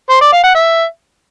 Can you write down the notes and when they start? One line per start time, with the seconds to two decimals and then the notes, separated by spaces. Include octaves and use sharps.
0.10 C5
0.21 D5
0.32 F5
0.44 F#5
0.55 E5